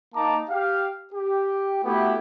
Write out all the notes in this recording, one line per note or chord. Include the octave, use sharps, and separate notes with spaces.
A#3 D#4 A5 A#5 D6
G4 F5
G4
A3 B3 E4 F#4 G4